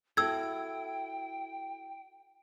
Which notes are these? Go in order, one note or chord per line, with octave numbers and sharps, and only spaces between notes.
E4 F#4 A4 G5 E6 G#6